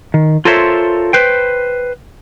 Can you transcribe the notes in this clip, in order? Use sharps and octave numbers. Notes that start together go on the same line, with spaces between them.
D#3
F4 A4 A#4 C5 C#5 E5
B4 C5 G5